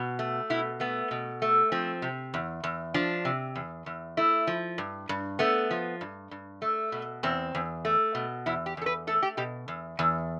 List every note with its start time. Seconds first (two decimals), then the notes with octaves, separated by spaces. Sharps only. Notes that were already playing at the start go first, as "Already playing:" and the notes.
Already playing: B2
0.19 A3
0.50 B2 E4
0.80 A3 B3
1.11 B2
1.42 A3
1.72 F3 C4
2.02 C3
2.34 E2
2.64 E2
2.94 F3 D4
3.25 C3
3.55 E2
3.86 E2
4.17 A3 E4
4.47 F3
4.78 G2
5.09 G2
5.39 A3 B3
5.71 F3
6.01 G2
6.31 G2
6.62 A3
6.92 B2
7.23 E2 C4
7.55 E2
7.85 A3
8.15 B2
8.46 E2 E4
8.66 G4
8.77 E2 A4
8.86 B4
9.07 A3 A4
9.22 G4
9.37 B2 G4
9.68 E2
9.99 E2